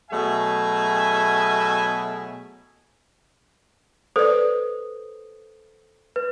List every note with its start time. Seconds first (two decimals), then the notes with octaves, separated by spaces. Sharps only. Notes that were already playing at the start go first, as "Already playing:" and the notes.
0.11 B2 F#3 A3 G#4 E5 G#5
4.16 A4 B4 C5 D5 D#6
6.16 B4